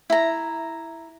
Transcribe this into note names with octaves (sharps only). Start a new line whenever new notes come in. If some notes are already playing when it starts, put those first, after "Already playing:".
E4 A#5